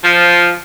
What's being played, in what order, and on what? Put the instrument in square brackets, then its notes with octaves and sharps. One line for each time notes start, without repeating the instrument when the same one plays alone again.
[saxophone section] F3